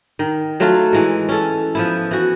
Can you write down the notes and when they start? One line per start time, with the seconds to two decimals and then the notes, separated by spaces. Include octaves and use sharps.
0.19 D#3
0.60 F#3 A3 F4
0.93 E3 G#3
1.29 C#4 A4
1.75 F3 B3 E4
2.11 E3 F#4